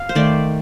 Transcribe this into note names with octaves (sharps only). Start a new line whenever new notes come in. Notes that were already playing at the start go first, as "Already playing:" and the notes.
Already playing: F5
C5
D#3 A3 D5